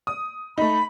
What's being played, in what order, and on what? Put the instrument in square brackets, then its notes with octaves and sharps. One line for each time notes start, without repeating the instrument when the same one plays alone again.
[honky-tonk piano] D#6
[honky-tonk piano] A3 D#4 [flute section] B5